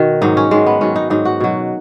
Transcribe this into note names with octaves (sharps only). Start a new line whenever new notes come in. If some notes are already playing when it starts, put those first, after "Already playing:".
Already playing: B2 D#3 F#4
G#2 F#3 D#4
C#4
G#2 D#3 F#3 G#3
B3
G#2 D#3 F#3 C#4
D#4
G#2 F#3 D#4
F#4
B2 F#3